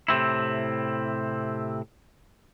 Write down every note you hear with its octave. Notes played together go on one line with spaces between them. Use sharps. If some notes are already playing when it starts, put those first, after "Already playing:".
A2 C3 C4 E4